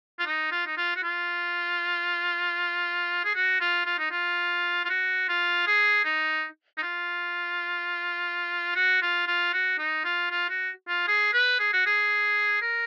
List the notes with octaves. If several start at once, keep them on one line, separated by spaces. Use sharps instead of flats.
F4
D#4
F4
D#4
F4
F#4
F4
G#4
F#4
F4
F4
D#4
F4
F4
F#4
F4
G#4
D#4
D#4
F4
F#4
F4
F4
F#4
D#4
F4
F4
F#4
F4
G#4
B4
G#4
F#4
G#4
A#4